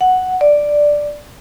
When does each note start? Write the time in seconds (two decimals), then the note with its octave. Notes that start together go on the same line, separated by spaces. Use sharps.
0.01 F#5
0.41 D5